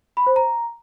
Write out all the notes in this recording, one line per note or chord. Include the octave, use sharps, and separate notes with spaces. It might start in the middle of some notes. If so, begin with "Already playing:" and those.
B5
C5
A#5